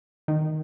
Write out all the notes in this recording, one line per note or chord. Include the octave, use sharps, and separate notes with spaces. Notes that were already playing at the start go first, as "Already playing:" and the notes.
D#3